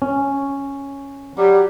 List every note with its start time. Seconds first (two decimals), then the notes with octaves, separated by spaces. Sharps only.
0.02 C#4
1.38 F#3 G3